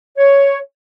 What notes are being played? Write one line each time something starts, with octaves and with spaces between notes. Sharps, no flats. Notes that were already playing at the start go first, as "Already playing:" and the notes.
C#5